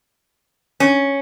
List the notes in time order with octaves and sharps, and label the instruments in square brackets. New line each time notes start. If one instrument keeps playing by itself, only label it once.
[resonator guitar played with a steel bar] C#4